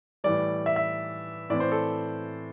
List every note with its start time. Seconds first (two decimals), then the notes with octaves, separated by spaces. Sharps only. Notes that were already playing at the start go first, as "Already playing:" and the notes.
0.24 A2 E3 G3 D5
0.66 E5
0.76 E5
1.50 A2 E3 C4 D5
1.60 C5
1.72 A4